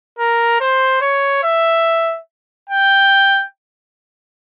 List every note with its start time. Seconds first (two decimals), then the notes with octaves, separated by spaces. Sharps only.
0.19 A#4
0.61 C5
1.01 C#5
1.44 E5
2.70 G5